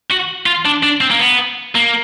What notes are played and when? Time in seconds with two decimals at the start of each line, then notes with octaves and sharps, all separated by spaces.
0.10 F#4
0.46 F4
0.66 D4
0.83 D4
1.01 C4
1.11 A#3
1.20 B3
1.75 A#3